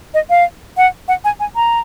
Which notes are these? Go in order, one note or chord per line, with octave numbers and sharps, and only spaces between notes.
D#5
F5
F#5
F#5
G#5
G#5
A#5